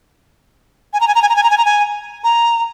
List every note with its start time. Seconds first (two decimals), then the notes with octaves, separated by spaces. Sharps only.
0.93 G#5
1.01 A#5
1.08 G#5
1.15 A#5
1.22 G#5
1.29 A#5
1.36 G#5
1.43 A#5
1.50 G#5
1.58 A#5
1.65 G#5
2.24 A#5